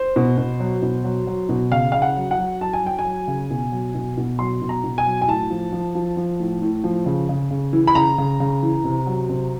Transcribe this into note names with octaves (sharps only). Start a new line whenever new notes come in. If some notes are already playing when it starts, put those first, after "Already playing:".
Already playing: C5
B2
B2
F#3
B2
F#3
F#3
B2
C#3 F5
C#3 F5
F#5
F#3
F#5
F#3
F#3 A5
G#5
F#3 G5
G#5
F#3
C#3
B2
F#3
B2
B2
F#3 C6
B2
A#5
B2
G#5
F#3
G#5
A2 A5
F3
F3
F3
F3
A2
A2
F3
C#3
C#3
C#3
E3
B5
C#3 A#5
C#3
C#3
E3
C3
F#3
C3